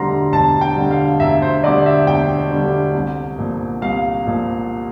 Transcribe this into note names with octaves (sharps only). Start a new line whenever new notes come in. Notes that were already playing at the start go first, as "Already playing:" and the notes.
Already playing: E1 D2 D3 G3 A#5 C6
E1 A5
G5
D2 D3 G3
F5
E1 E5
C5
D2 D3 G3 D5
E5
E1 G5
D2 D3 G3
C2
A#2 F3
C2 F5
A#2 F3